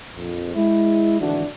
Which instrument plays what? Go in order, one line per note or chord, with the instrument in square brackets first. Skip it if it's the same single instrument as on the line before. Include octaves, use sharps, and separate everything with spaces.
[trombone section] A#1 F2
G#3 E4
G#1 D2 E3 A3 D4 F#4